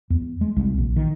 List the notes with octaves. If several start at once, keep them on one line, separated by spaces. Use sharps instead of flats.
E2
G#3
C2
A#1
D#3